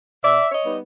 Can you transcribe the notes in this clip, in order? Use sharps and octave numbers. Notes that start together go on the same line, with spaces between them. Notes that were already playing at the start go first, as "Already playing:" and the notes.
B2 D5 E5
C#5 D#5
G3 B3 D#4